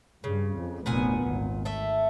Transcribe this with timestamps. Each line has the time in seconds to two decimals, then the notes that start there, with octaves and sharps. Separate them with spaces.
0.24 G2 C#3
0.55 F2
0.86 F1 D2 A#2 B3 F#5 G#5
1.25 G#1
1.65 A3 E5